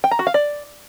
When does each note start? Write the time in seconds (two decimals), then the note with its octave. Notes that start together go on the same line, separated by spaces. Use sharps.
0.04 G5
0.11 A#5
0.19 F#4
0.27 F5
0.34 D5